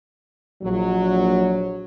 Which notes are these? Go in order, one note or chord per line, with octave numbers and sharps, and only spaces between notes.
A#1 F#3